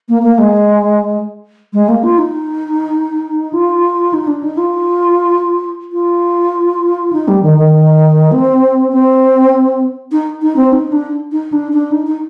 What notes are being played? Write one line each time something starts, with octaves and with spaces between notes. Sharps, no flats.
A#3
A#3
G#3
G#3
A#3
F4
D#4
F4
D#4
D4
D#4
F4
F4
D#4
G3
D#3
D#3
C4
C4
D#4
D#4
C4
D#4
D4
D#4
D4
D4
D#4
D#4